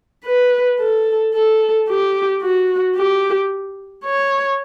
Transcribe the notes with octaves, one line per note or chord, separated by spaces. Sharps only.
B4
A4
A4
G4
F#4
G4
C#5